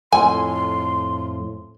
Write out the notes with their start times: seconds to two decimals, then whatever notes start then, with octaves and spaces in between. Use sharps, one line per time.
0.12 F2 A2 G#5 C6